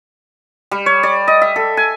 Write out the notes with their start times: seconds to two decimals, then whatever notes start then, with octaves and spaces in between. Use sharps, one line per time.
0.71 G3
0.86 C#5
1.03 D5
1.28 D#5
1.42 E5
1.56 A4
1.77 G#5